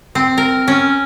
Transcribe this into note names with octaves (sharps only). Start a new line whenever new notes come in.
C4
A#4
C#4